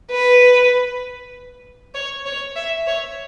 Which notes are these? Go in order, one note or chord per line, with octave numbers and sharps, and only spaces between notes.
B4
C#5
C#5
E5
C#5